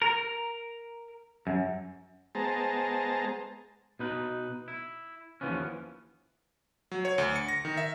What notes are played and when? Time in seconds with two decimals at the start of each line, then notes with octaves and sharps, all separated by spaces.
0.02 A#4
1.47 F#2
2.35 G#3 B3 G#4 C5 A5 A#5
3.99 B2 D#4 B4
4.68 E4
5.41 D#2 E3 F3 B3 C#4
6.91 F#3
7.05 C#5
7.18 D2
7.36 C#7
7.48 A#6
7.65 D#3
7.77 E5